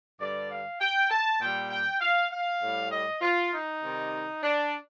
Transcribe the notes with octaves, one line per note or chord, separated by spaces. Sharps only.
G2 D3 G3 D5
F5
G5
A5
A#2 G3 G5
G5
F5
F5
A2 G3
D#5
F4
D#4
C3 D#3 G3
D4